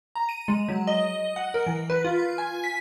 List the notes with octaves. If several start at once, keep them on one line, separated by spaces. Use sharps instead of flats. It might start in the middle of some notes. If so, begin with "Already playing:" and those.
A#5
D#7
G#3
F#3
D#5
F#5
A#4
E3
B4
F4
G#5
B6